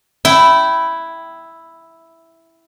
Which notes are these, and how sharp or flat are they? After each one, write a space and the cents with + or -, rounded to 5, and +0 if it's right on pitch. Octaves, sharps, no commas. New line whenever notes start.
E4 +0 G5 -20